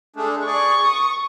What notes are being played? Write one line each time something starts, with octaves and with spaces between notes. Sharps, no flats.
G#3 A3 D4
G#4 D5 C#6
D#6